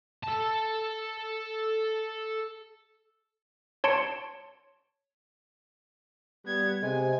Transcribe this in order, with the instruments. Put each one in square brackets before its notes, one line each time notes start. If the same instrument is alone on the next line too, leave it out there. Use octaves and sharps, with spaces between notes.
[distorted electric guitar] A4 A5
[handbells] C#5 A5 C6 C#7 D7
[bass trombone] G3 [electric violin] B3 G#6
[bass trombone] C3 [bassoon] G#3 [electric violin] G#5